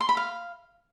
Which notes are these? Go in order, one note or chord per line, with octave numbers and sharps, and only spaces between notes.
C6
B5
F5